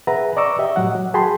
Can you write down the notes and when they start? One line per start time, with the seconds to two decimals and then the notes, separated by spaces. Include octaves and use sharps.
0.07 G#4 B4 E5 F#5 A#5
0.37 D5 D#5 A#5 C#6 D6 E6
0.59 G4 D#5 E5
0.76 A2 F#3 F#5
0.95 F#3
1.14 F#4 G#4 G5 A5 B5 C6